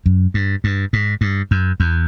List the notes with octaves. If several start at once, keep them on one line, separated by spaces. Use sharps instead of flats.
F#2
G2
G2
G#2
G2
F#2
E2